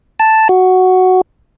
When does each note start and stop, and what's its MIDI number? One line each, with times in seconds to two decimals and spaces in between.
0.20 0.48 81
0.49 1.21 66